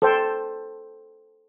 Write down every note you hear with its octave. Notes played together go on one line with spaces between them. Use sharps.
A4 C5 G5